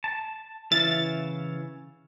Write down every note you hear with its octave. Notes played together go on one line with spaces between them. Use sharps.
A5
C#3 E3 E5 F5 A6